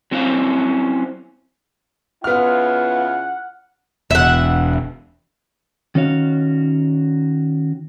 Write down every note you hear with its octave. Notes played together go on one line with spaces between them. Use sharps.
F#3 C4 C#4 E4 C5 F5
C#3 B3 E4 F4 F#5 F6
E1 E5 F#5
D#3 C#4 F#4 C#5 F5